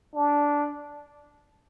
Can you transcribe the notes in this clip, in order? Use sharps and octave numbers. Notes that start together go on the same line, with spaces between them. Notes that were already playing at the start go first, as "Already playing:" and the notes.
D4